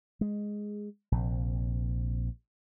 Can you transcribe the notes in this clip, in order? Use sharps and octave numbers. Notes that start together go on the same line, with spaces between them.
G#3
A#1 C3